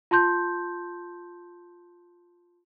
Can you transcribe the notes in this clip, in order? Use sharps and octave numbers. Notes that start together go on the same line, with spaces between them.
F4 A5 C6 G6